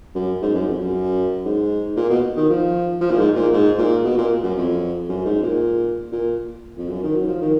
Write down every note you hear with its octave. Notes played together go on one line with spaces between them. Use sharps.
F#2
G#2
F#2
F2
F#2
G#2
A#2
B2
D#3
F3
F3
A#2
G#2
A#2
G#2
A#2
B2
A#2
F#2
F2
F#2
G#2
A#2
A#2
F2
F#2
D#3
F#3
F3
D#3